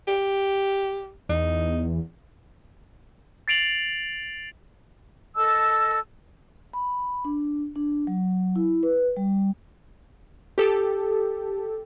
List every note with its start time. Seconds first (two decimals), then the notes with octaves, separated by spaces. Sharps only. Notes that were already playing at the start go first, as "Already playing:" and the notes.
0.08 G4
1.29 E2 D#4
3.48 A6 C7 D7 F7 F#7
5.35 A4 D#5 A5 E6
6.73 B5
7.25 D4
7.75 D4
8.07 F#3
8.56 E4
8.83 B4
9.16 G3
10.58 G4 A4